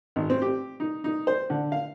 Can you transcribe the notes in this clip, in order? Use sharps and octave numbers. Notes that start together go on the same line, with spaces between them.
G#1
C4
G4
D#4
D#4
C5
D3
F5